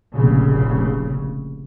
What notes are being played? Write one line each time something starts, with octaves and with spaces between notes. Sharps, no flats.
F1 A#1 C#3